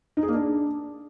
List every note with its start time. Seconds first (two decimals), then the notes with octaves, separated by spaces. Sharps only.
0.17 D#4
0.23 G#4
0.28 A#3
0.34 D4